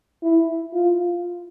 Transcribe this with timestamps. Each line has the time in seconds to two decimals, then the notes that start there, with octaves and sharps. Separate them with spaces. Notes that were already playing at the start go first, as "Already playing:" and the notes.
0.23 E4
0.73 F4